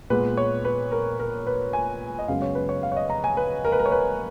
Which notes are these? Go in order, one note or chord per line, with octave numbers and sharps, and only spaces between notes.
A#2 G#3 B3 B4
C#5
B4
A#4
A#4
B4
G#5
D#5
F#2 C#3 G#3 B3 F5
C#5
B4
C#5
F5
C#5
D#5
A#5
G#5
B4
A#4
B4
A#4
C#5
B4